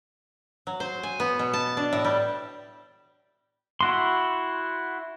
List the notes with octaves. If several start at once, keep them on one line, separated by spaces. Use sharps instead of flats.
F#3
C5
G#5
B3
B2
A5
D4
A2
G3
E4 F#4 C6